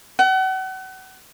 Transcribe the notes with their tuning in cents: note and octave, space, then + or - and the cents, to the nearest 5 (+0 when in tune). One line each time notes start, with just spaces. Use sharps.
F#5 +35